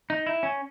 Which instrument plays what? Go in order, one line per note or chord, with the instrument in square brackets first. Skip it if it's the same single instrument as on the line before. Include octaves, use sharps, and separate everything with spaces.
[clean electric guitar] D#4
E4
C#4